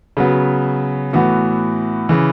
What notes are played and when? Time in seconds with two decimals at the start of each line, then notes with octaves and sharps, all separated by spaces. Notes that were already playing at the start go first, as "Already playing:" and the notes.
0.17 C#3 F#3 B3
1.13 A2 E3 B3 F#4
2.09 C#3 E3